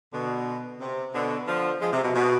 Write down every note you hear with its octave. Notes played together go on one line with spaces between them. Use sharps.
B2 D3
C3
B2 D3
D3 F3
F3 G#3
C3
B2
B2